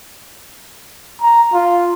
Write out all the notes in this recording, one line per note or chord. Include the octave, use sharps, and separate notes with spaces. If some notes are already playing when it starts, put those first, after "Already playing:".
A#5
F4